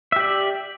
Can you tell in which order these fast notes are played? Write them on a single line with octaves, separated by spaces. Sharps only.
E5 G4 D5